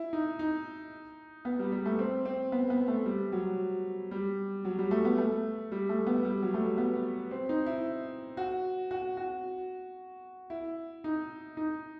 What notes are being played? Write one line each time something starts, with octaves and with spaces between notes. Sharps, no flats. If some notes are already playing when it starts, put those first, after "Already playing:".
Already playing: E4
D#4
D#4
B3
G3
G3
A3
C4
C4
B3
B3
A3
G3
F#3
G3
F#3
G3
A3
B3
A3
G3
A3
B3
G3
F#3
A3
G3
B3
C4
D#4
E4
F#4
F#4
F#4
E4
D#4
D#4